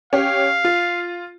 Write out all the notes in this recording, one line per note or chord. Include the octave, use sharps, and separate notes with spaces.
C#4 G4 F5
F4